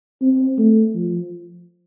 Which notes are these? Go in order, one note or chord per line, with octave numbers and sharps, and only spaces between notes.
C4
A3
F3